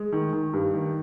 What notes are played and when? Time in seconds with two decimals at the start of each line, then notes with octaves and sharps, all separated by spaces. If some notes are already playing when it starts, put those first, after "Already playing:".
Already playing: G#3
0.13 D#3
0.33 D#3
0.53 G2
0.73 D#3